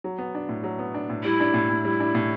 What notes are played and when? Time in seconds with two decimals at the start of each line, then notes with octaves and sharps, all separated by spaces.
0.04 F#3
0.18 B3
0.35 D4
0.49 A2
0.64 F#3
0.79 B3
0.94 D4
1.09 A2
1.24 G3 E4
1.40 D4
1.54 A2
1.69 A2
1.84 G3
2.00 D4
2.15 A2